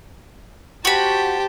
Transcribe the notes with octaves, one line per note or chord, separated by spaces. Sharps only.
F#4 G4 C5 A5 B5